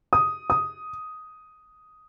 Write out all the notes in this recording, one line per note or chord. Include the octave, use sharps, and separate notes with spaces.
D#6
D#6